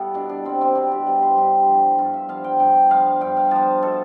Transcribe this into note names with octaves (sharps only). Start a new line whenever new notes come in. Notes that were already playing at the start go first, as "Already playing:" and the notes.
Already playing: G3 B3 E4 A4 B4
B2 D4
D4
G3 B3 C4
C4
B2 D4
G4
G3 B3 B4
C5
G2 G4
F3 B3
G2 F4
E5
F3 B3 F5
G5
G2 G5
F3 B3 F5
G2 G5
F5
F3 B3 A5
B2 A4